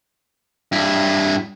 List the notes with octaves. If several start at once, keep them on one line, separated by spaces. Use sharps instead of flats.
G2 E4